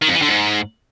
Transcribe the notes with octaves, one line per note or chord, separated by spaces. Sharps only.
D#3
F2
E3
D3
G#2